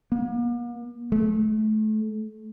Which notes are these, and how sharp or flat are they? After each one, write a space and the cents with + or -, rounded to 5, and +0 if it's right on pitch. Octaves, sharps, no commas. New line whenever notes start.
A#3 +45
A3 -30